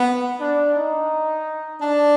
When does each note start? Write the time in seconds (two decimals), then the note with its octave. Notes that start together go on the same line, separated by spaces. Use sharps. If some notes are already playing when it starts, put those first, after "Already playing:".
Already playing: B3
0.39 D4
0.75 D#4
1.81 D4